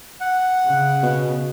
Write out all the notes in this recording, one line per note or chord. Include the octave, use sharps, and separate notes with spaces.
F#5
C#3
B2